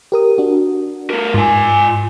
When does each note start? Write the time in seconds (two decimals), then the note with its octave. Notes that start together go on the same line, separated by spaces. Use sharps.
0.12 G4 A#4 D#6
0.38 D4 F#4
1.10 A3 A#4
1.34 G#2 F4 G#5